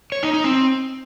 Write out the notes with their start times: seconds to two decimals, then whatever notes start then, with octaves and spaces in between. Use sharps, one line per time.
0.12 C#5
0.23 D#4
0.34 D#4
0.44 C4